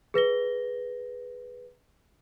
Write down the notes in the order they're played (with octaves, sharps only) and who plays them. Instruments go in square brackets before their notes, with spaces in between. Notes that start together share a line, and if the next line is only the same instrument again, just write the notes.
[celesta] G#4 B4 A#6 G7